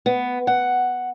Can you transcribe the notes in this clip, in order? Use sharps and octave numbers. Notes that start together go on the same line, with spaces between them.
B3
F#5